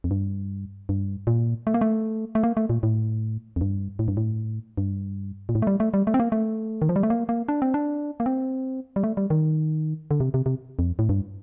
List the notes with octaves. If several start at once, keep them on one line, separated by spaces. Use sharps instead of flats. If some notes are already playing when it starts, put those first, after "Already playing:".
F2
G2
G2
A#2
A3
A#3
A3
A3
A#3
A3
A#2
A2
F2
G2
A2
G2
A2
G2
A#2
A2
A3
G3
A3
G3
A3
C4
A#3
A3
D#3
F3
G3
A3
A#3
A#3
D4
C4
D4
A#3
C4
G3
A3
G3
D#3
D3
C3
C3
C3
F2
A2
G2